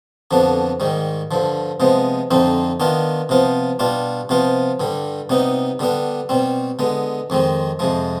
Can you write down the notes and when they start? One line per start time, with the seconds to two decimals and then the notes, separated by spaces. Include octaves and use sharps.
0.31 F2 D3 F3 B3 D4
0.80 G#2 D#3 G3
1.31 G2 D3 F3
1.80 C3 F3 G#3 B3
2.31 F2 D3 F3 C4 D#4
2.80 D#3 B3 D4 F4
3.29 C3 F3 B3 F4
3.79 B2 G3 D4 F4
4.29 C3 F3 B3 F4
4.80 G2 D3 G3
5.29 C3 G3 B3 D#4
5.79 D3 G3 B3 D4
6.29 B2 G3 C4
6.79 D3 G#3 B3
7.30 F2 D#3 G#3 C4
7.79 F2 C3 F3 G#3